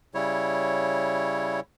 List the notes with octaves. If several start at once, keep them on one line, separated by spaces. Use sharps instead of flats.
C#3 G3 E4 C#5